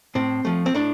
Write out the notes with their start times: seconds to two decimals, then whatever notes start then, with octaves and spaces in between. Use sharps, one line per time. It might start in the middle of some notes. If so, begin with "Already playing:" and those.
0.15 A2 C4
0.45 F3 A3
0.66 C4
0.74 A2 D4